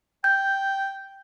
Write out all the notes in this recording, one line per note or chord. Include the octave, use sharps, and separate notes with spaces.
G5 G6